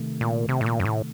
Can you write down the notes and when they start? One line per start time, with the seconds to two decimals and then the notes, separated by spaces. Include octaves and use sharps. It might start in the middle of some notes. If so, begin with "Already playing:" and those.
Already playing: C3 D#3 A3
0.21 A#2
0.49 C3
0.61 A2
0.66 A#2
0.80 F#2
0.85 A2